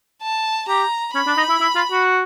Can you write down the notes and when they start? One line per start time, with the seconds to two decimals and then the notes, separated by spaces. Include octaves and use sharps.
0.22 A5
0.68 G4 A#5
1.14 C#4 B5
1.27 D4
1.37 D#4
1.49 E4
1.60 E4
1.75 F4
1.91 F#4